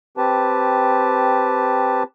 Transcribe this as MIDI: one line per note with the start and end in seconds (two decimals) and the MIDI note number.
0.17 2.03 60
0.17 2.03 67
0.17 2.03 71
0.17 2.03 81